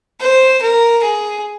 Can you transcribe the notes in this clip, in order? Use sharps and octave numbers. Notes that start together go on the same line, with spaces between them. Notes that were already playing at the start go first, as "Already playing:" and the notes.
C5
A#4
G#4